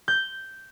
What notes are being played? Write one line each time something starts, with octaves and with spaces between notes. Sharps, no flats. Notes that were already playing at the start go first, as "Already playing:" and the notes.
G6